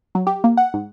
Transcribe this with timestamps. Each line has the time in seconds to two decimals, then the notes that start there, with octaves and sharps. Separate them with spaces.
0.15 F#3
0.27 G4
0.44 A#3
0.57 F#5
0.74 G#2